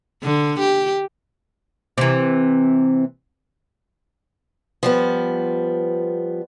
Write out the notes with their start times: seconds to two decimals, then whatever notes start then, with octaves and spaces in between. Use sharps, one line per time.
0.23 D3
0.60 G4
1.98 C3 E3
4.83 F3 G3 B3